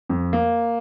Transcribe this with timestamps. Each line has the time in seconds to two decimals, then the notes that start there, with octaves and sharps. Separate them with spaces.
0.09 F2
0.33 A#3